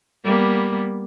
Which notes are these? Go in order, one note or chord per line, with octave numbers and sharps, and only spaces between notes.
G3 A#3 B3